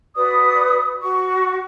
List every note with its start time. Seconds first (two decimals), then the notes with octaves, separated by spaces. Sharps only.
0.16 F#4 B4 D5 D#6
1.01 F#4 C#6